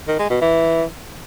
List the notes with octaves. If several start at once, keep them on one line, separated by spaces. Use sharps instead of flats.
D#3
G#3
B2
E3